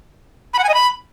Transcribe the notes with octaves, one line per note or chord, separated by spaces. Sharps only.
B5
F#5
G#5
D#5
B5